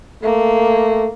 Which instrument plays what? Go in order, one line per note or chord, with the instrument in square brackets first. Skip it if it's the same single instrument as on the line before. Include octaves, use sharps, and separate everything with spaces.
[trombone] A3 [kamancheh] A#3